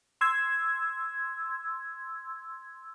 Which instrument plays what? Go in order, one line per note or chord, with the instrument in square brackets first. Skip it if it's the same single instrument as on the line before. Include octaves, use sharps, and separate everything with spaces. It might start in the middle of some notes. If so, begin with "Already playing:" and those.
[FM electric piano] C6 E6 G#6